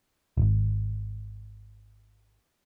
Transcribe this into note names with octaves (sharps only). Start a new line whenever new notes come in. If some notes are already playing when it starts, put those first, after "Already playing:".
D#1 G#1